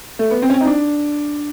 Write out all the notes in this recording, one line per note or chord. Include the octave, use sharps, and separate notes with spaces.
A3
B3
C4
C#4
C4
D#4
D4